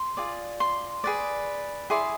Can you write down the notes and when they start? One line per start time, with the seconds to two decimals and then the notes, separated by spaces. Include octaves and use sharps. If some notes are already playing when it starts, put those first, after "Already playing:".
Already playing: C6
0.17 F4 G#4 D5
0.60 C6
1.04 G#4 B4 D5
1.90 E4 G#4 D5 C6